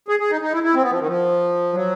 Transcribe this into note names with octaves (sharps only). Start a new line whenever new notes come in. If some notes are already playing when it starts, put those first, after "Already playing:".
G#4
G#4
D#4
D#4
E4
E4
C4
B3
F3
D#3
F3
F#3